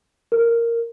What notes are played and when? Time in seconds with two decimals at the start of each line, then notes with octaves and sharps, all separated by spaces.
0.32 A#4